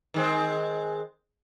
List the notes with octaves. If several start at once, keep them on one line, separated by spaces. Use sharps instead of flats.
D#3 G#3 C4